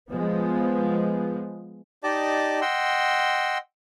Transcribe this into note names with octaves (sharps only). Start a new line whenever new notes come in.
F3 G#3 B3
D#4 G4 D5 D#5 A5 D6
D#5 F#5 G5 C6 E6